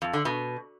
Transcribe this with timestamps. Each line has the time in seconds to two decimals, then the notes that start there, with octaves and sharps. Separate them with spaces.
0.02 F2
0.13 D3
0.25 B2